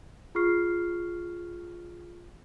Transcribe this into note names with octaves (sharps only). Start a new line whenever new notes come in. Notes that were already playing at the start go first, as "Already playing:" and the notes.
F4 G#4 C#6 F6 C7